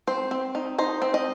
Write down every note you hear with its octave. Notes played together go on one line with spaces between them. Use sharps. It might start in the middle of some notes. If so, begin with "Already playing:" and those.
C4 C5
C4
D#4
D#4 C5
C4
D#5